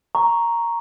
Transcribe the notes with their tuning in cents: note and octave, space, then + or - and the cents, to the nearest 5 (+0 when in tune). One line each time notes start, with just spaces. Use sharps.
A#5 +0 C#6 +0